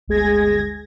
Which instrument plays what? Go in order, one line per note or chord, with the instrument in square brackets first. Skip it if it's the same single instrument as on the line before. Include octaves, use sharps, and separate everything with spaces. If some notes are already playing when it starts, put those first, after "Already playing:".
[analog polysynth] G1 D2 G#3 G#4 G#6 A#6